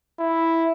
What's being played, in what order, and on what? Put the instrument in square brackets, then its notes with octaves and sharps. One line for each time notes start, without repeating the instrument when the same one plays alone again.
[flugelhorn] E4